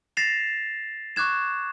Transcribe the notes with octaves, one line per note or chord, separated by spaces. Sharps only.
A6 A#6 C7 E7 F7
C#6 D6 F#6 G#6 E7